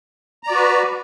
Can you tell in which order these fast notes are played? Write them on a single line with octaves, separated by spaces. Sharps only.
A#5 D5 F#4 B4